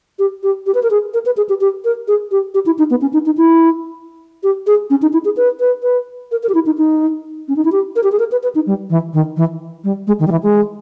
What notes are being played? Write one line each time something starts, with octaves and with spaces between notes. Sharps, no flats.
G4
G4
G4
B4
A#4
G#4
A#4
B4
G#4
G4
G4
A#4
G#4
G4
G4
E4
D#4
B3
C#4
D#4
D#4
E4
G4
G#4
C#4
D#4
E4
G#4
B4
B4
B4
A#4
A#4
G4
E4
D#4
D#4
C#4
D#4
E4
G4
A#4
G4
G#4
A#4
B4
B4
D#4
G3
E3
D#3
E3
G3
G#3
D#3
G3
E3
G#3